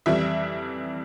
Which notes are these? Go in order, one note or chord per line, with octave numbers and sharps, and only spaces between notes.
F2 E3 G3 E5